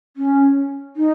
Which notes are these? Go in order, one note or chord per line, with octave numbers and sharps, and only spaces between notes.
C#4
D#4